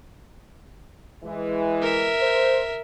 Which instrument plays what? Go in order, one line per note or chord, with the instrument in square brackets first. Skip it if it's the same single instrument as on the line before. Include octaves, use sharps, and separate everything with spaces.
[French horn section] E3 G#3
[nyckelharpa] A#4 E5
[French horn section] C5